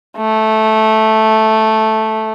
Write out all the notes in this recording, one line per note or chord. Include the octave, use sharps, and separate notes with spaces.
A3